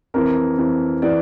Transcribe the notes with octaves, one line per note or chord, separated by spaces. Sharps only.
F2 E3 A#4
F2 E3
E3 D5